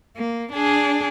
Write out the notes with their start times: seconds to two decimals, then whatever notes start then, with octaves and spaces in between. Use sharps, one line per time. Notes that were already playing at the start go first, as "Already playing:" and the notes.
0.16 A#3
0.52 D4 G#4